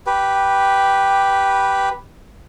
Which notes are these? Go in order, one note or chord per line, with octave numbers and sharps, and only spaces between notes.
G4 B4